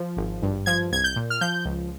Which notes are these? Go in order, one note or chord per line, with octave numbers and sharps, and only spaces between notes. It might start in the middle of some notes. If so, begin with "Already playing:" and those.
Already playing: F3
G#1
G2
F3 G#6
C2 G#6
G6
A#2
F6
F3 G6
C#2